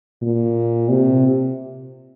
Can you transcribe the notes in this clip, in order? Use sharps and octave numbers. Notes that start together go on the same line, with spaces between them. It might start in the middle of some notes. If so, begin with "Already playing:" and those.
A#2
C3